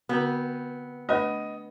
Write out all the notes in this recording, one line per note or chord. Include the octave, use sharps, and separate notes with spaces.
D3 B3 C4 F#4
A3 D4 B4 D#5